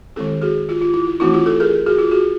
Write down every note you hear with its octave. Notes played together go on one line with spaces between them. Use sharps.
D#3 G#3 C4 E4 G4 A4
F#4 G#4
F4 G4
F4
E4
E4
E3 A3 C4 D#4 E4 F#4
F4 G4
G4 A4
G#4 A#4
F#4 G#4
F4 G4
F#4 G#4